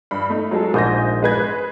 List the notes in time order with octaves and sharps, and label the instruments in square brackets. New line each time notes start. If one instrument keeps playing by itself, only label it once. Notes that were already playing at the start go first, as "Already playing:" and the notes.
[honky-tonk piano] G2 B5
A3 D#4
F#3 G#3 A4
[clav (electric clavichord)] A#1 G#2 [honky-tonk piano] D#6 G6 A#6
[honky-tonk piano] G#3 B4 G#6